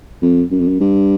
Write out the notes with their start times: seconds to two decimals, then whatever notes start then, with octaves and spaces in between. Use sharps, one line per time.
0.22 F2
0.51 F#2
0.60 F2
0.68 F#2
0.80 G2